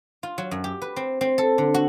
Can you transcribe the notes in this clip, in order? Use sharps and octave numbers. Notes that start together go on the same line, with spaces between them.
F4
F#3
F#2
G4
B4
C4
C4
A4
D3
F#4